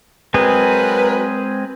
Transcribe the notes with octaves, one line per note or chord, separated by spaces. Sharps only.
F#3 G#3 C4 G#4 A#4 B4